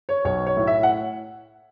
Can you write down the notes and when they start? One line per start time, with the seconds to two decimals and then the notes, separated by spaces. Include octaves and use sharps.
0.09 C#5
0.24 B1 C#5
0.46 C#5
0.57 A2
0.67 E5
0.83 F#5